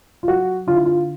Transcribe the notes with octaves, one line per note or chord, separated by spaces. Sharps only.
F4
F#3 F#4
D3 F4
E4
F4